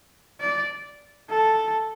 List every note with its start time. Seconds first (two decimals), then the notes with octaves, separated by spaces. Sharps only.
0.40 D5
1.29 A4